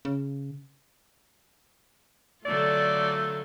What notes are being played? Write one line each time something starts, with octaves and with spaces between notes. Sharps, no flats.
C#3
D3 F#3 A3 F4 D5